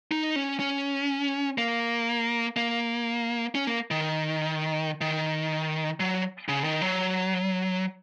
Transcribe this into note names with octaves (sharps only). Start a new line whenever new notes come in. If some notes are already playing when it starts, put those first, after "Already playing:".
D#4
C#4
C#4
A#3
A#3
C#4
A#3
D#3
D#3
F#3
C#3
D#3
F#3